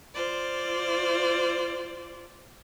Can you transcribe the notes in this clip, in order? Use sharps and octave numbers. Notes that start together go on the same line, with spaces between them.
F4 C5 D5